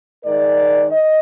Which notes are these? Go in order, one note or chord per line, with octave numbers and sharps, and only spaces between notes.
G#2 D#3 G#3 A#4 D5
D#5